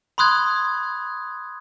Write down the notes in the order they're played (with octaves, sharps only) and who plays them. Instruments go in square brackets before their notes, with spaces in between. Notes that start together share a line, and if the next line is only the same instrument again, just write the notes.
[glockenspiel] B5 C6 D#6 F#6 G#6